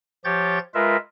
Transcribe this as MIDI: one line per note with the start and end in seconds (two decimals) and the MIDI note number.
0.24 0.59 53
0.24 0.59 67
0.24 0.59 73
0.24 0.59 91
0.24 0.59 93
0.74 0.97 56
0.74 0.97 65
0.74 0.97 70
0.74 0.97 71
0.74 0.97 76